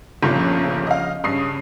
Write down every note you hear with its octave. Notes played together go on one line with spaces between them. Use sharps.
G1 G2 A#2 C#3 F3
D#5 F5
G2 C#3 D#6 C7